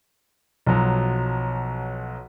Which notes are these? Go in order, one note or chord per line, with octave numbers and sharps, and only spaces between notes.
B1 F3 F#3